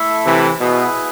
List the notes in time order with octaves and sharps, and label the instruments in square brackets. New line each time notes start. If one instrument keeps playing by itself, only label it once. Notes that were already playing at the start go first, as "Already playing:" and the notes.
Already playing: [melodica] A3 E4 A4 E5
[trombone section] C3 E3
[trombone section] B2 [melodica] E4 G#4 B4